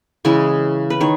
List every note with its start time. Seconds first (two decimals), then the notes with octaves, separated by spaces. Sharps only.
0.25 C#3 E3 G#3 G#5
0.90 B4
1.00 D#3 C#5